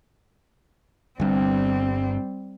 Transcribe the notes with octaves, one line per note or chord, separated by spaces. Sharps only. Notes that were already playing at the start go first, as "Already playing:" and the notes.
G1 G2 G3 C4